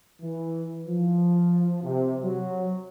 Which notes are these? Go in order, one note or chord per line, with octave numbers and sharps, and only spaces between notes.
E3
F3
C3
F#3